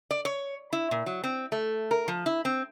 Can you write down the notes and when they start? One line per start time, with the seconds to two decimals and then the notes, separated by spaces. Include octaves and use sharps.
0.11 D5
0.25 C#5
0.73 E4
0.91 A#2
1.06 F#3
1.24 C4
1.52 A3
1.91 A#4
2.08 F3
2.26 E4
2.45 C4